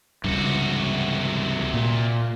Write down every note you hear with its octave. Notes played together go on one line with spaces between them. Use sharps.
C#2 G2 C3 F#4
A#2